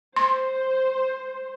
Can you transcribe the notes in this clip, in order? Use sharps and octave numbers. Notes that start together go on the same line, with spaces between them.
C5 C6